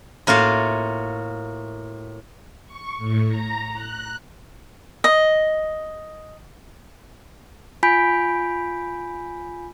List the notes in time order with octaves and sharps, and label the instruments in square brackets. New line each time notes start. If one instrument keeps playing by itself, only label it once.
[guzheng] A2 A#3 F4 F#4 F5
[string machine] C#6
A2
A#5
F#6
[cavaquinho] D#5
[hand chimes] F4 G#5 B5 G6 B6 D7